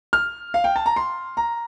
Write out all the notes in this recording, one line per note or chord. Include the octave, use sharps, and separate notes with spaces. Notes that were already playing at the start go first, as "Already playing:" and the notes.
F6
F5
G5
A5
A#5
C6
A#5